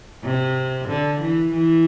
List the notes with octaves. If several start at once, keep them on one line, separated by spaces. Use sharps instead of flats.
C3
D3
E3
E3